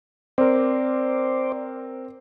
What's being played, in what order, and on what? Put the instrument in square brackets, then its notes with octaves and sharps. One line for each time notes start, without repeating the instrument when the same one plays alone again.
[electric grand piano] C4 A#4 [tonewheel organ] C5 D5